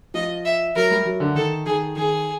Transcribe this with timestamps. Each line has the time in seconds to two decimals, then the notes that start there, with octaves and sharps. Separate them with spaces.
0.14 F3 D#5
0.45 E5
0.76 F#3 A#4
0.91 G3
1.05 F#3
1.20 D3
1.35 D#3 A4
1.66 D#3 G#4
1.96 D#3 G#4